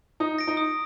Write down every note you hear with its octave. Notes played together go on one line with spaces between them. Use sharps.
D#4 D#6
A#6 D7
D#4
D#6